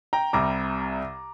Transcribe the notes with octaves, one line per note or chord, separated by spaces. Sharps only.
G5 A#5
C2 C3 G3 A#5 D6